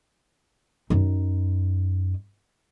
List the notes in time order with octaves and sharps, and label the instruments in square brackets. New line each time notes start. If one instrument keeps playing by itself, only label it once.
[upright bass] F#2 D#4